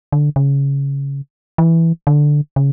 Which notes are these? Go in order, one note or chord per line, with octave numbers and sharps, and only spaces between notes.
D3
C#3
E3
D3
C#3